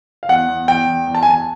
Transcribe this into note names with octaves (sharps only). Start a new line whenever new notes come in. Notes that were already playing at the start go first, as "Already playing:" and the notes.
F5
E2 F#5
E2
E2 G5
E2
E2
A5
G#5
E2 A5